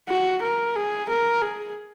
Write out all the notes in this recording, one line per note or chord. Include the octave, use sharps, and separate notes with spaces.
F#4
A#4
G#4
A#4
G#4